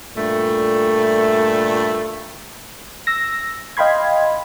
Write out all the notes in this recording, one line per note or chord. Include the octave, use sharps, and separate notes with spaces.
G2 A#2 A3
E6 A#6
D#5 F5 G5 B5 C6 G#6